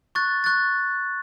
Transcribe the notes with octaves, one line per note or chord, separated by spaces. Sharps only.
C#6 F#6 A6
C#6 F#6 A6